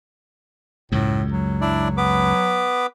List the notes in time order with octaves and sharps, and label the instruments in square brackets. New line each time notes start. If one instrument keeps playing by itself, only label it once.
[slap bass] C#2 F#2 [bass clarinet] A2
[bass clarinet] F#3
[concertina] D4 E4 D5
B3 B4 D6